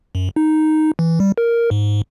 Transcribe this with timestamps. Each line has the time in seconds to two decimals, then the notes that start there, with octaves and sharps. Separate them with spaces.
0.15 F#2
0.36 D#4
0.99 E3
1.20 G3
1.38 A#4
1.71 G#2